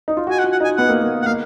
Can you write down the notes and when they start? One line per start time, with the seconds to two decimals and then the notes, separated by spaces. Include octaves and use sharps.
0.08 D#4
0.17 F4
0.27 F#4 G#5
0.39 F#5
0.44 F4
0.52 F#5
0.60 D#4 G#5
0.77 B3 F#5
0.89 A#3
1.01 A#3
1.22 F#5
1.26 A#3 F5